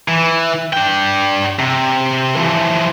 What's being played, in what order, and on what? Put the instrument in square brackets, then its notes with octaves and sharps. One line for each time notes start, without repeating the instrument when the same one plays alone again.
[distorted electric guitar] E3
D4 G5
C3
E3 F3